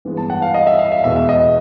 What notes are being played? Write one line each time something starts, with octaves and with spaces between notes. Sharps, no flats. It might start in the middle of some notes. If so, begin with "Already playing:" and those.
G2 E3 G#3 B3
A5
F#5
F5
D#5
E5
F5
E5
E2 B2 G#3 B3 E5
E5
D#5